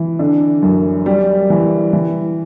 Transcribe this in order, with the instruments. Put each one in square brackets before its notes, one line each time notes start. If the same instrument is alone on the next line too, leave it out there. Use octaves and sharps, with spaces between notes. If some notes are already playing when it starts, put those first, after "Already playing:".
Already playing: [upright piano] E3
D3
F#2
G3
E3
E3